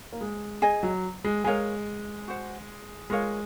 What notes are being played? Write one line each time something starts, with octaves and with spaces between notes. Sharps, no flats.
A#3
G#3
G#4 D#5 G#5
F#3
G#3
G#3 A#4 C#5 F5 G#5
F#4 C5 F#5
G#3 F4 A#4 C#5 F5